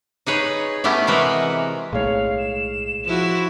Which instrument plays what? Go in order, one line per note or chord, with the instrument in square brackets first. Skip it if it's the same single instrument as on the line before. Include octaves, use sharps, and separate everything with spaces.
[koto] D#4 G#4 B4 C#5
A3 B3 C#4 E4 G4
C3 E3 G#3 F#4 A#4 B4
[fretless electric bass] B1 A2 [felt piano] G#3 C#5 [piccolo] F5
[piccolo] E7
[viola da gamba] F3 E4 F#4